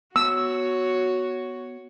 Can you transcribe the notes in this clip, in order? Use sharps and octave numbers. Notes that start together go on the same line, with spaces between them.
B3 F#4 C#5 E6